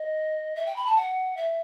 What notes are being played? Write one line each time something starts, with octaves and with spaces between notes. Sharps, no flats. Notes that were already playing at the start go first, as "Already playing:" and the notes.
Already playing: D#5
E5
G5
B5
A5
F#5
E5